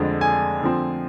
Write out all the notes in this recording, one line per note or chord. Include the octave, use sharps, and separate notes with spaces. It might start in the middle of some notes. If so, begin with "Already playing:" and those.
Already playing: F2 D3 G#3 D4
G#5
D3 F3 C4